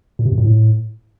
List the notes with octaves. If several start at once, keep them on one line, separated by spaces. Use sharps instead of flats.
A#2
C3
F#2
A#2
A2